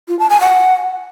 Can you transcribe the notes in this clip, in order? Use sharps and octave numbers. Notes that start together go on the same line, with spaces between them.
F4
A5
G#5
F#5